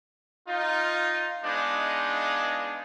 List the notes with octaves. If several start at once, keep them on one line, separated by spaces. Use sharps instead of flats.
D#4 F4
G#3 B3 D4 D#4 F4